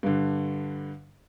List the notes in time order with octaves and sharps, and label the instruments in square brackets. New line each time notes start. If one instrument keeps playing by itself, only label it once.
[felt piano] G2 D3